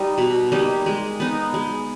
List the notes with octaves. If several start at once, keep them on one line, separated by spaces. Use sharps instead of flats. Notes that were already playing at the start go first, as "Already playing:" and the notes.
Already playing: G3 D#4
B2
G3 A#3 D#4
G#3
B3 D#4
G#3